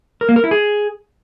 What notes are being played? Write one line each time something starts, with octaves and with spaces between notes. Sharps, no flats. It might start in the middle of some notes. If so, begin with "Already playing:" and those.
A#4
A#3
A#4
E4
G#4